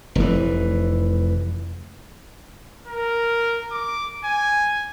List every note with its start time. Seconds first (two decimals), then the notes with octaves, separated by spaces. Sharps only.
0.15 F1 E3
2.88 A#4
3.72 D6
4.25 G#5